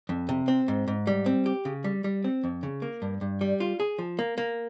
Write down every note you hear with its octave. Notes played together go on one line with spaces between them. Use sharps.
F2
C3
C4
G#2
G#2
G3
C4
G4
C#3
G3
G3
C4
F2
C#3
A#3
G2
G2
G3
F4
G#4
F3
A#3
A#3